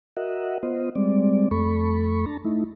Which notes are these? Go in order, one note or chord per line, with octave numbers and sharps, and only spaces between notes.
F#4 A#4 D#5 E5 F#5
B3 F4 C5 D#5
G3 G#3 C4 D5
F2 A3 A4 B5 C#6
D4 A5 A#5
A3 D#4 E4